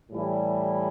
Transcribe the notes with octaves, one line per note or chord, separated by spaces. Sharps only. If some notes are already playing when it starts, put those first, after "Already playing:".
A2 E3 G3 E4